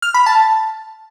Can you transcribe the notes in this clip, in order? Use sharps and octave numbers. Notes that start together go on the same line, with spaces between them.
F6
B5
A5